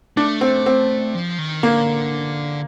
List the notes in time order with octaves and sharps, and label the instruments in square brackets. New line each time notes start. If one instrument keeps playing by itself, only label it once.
[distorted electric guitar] A3 [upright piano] D4
[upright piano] C4
C4
[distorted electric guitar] F3
D#3
[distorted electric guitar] D3 [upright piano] A#3